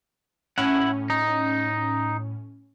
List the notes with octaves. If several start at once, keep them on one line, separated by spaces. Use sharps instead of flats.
A2 C#4 E4 F#5
D#4